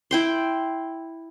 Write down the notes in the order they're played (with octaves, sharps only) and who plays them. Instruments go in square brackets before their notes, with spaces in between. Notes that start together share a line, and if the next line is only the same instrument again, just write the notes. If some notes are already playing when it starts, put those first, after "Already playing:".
[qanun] E4 G5 C6